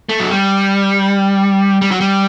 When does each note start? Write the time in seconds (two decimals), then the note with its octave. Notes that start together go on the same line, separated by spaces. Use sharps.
0.09 A3
0.20 F#3
0.31 G3
1.82 G3
1.91 F#3
2.00 G3